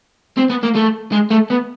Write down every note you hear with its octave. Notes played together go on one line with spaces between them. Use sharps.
C4
B3
A#3
A3
G#3
A3
B3